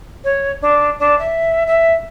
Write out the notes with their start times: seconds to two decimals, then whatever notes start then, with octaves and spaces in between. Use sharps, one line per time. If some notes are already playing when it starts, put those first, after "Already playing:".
0.24 C#5
0.61 D4
0.99 D4
1.19 E5
1.67 E5